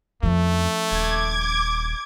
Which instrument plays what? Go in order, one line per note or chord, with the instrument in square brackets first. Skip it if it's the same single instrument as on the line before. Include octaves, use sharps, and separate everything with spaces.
[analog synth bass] F2 [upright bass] F3 C#4 [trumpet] A3
[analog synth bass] D#1 [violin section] D6 G#6